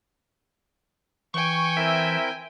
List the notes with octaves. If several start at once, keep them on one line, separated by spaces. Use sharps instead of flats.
E3 G5 G#5 C#6
C4 E4 A#4 E5